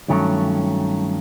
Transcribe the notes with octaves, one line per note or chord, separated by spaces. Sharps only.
G2 D#3 F#3 A3 C#4